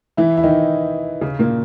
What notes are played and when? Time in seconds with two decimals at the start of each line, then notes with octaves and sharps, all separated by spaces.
0.17 E3 E4
0.37 E4
0.43 D#3 D#4
1.21 C#3 C#4
1.39 A#2 A#3